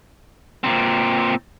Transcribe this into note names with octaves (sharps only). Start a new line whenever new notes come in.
A#2 C4